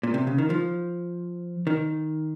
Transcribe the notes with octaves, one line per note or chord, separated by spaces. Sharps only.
A#2
C3
C#3
D#3
F3
D#3